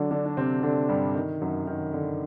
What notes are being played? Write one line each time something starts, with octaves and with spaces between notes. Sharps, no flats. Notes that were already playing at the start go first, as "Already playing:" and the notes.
Already playing: D3 F#3 D4 F#4
D3 D4
D4
C3 C4
D3 D4
G2 G3
D#3
F#2 F#3
D#3
D3